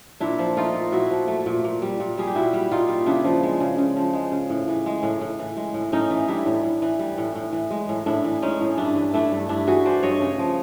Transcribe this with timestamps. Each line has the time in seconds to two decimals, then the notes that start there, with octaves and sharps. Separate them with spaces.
0.20 A#2 D4 E4
0.39 F3
0.56 A3 D#4 F4
0.75 A#2
0.92 A#2 E4 F#4
1.10 F3
1.28 A3
1.46 A#2
1.64 A#2
1.82 G3
2.00 A#2
2.18 G3 G#4
2.27 G4
2.35 A#2 E4 F#4
2.53 G3
2.71 A#2 D#4 F4
2.88 G3
3.06 C#3 D4 E4
3.24 F3
3.43 G#3
3.60 C#3
3.78 C#3
3.96 F3
4.13 G#3
4.32 C#3
4.50 A2
4.68 E3
4.86 G#3
5.03 A2
5.21 A2
5.39 E3
5.57 G#3
5.74 A2
5.92 A2 C#4 D#4
6.10 E3
6.28 G3 D4 E4
6.46 A2
6.63 A2
6.82 E3
6.99 G3
7.18 A2
7.35 A2
7.53 E3
7.70 G#3
7.89 A2
8.06 A2 D4 E4
8.24 E3
8.42 G#3 C#4 D#4
8.61 A2
8.77 G2 D4 E4
8.95 E3
9.14 A3 D4 E4
9.32 G2
9.49 G2 D4 E4
9.67 E3 F#4 G#4
9.85 A3 C5 D5
10.03 G2 C#5 D#5
10.21 C#3
10.38 F3